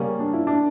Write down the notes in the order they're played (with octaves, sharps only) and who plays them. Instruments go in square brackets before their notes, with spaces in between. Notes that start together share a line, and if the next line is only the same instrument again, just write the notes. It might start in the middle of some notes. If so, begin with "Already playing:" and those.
Already playing: [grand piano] C#3 G3 C#4 [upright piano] A#3
[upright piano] D4
E4
D4